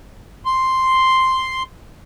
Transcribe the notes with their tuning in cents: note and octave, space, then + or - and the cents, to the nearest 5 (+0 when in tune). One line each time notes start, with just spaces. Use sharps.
C6 +0